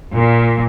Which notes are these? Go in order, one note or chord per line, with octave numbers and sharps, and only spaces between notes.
A#2